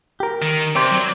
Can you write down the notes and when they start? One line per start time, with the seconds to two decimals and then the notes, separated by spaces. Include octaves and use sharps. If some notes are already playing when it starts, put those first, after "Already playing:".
0.20 G4 A#4
0.42 D#3
0.75 C3 C4 C5 D5
0.91 F#3